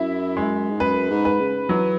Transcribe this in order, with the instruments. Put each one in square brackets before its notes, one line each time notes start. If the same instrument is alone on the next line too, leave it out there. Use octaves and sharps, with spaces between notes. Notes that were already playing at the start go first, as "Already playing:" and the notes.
Already playing: [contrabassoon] F#2 [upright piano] E4
[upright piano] G#3
[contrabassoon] G#2
[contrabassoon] F#2 [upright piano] B4
[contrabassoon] G#2
[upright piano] B4
[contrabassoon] C#3
[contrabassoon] E3 [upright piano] F#3